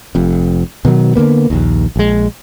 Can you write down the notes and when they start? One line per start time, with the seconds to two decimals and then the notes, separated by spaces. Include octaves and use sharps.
0.15 F1 F2
0.85 B2 D#3 F#3
1.15 D3 D#3 A#3 B3
1.50 A#1 D#2
1.96 A#1 G#3